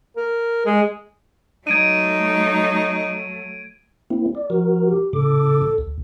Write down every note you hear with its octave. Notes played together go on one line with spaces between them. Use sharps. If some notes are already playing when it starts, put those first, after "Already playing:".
A#4
G#3
F#3 A3 D#4 G#6 D7 D#7
A#3 C4 E4
D5
F3 F#4 A#4
G4
A2 C#3 A4 D6
D2